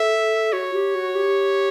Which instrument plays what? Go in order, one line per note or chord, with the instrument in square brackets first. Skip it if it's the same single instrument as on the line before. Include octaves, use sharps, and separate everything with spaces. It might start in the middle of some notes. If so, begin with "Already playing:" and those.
Already playing: [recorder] A4 [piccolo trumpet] E5
[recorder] F#4 [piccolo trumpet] C#5
[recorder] G4
F#4
G4